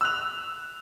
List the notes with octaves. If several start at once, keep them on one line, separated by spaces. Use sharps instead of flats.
E6 F#6 F7